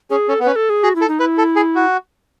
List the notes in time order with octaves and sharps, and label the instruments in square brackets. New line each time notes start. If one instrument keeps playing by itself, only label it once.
[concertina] C#4 [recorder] G#4
[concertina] C#4 [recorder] A4
[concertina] B3
[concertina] C#4 [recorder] B4
[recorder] A4
G#4
[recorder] F#4 [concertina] G#4
[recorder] E4
[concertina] A4
[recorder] D#4
[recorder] E4 [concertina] B4
[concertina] A4
G#4
F#4